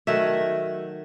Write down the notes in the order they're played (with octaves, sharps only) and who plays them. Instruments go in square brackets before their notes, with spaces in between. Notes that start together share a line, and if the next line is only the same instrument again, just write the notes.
[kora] D#3 F#3 A3 E5